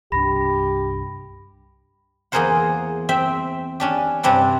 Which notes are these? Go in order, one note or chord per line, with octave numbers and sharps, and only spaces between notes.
C2 G2 D4 G4 B5 A#6
E2 A#3 G#4 A#4 C5 F#5
C4 E5 G5
C#4 D4 G4
G2 C3 G3 C4 D4 F#5